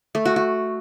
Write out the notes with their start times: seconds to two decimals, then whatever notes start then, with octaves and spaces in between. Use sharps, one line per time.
0.15 A3
0.25 F#4
0.36 F#4